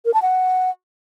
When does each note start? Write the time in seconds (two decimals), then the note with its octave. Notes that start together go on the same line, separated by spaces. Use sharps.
0.05 A#4
0.14 A5
0.22 F#5